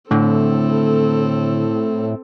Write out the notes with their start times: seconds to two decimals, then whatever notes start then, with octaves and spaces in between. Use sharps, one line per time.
0.11 A2 D3 C4 A4